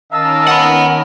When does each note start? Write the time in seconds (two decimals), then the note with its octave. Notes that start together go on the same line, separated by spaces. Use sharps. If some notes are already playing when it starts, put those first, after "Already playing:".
0.12 D#3 C#4 A#4 D#5 F5 A5 E6
0.48 F#5 B5